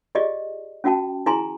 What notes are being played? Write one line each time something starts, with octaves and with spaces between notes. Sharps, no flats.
F4 G4 G#4 D5 D#5
C#4 F4 F#4 G5 A5
E4 F4 G#4 G#5 A#5 C6